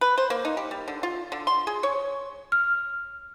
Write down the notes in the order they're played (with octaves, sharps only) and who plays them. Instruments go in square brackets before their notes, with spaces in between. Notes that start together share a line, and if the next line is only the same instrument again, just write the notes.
[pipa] B4
C5
A#3
D#4
G4
G3
D3
F4
D3
C6
G#4
C#5
[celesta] F6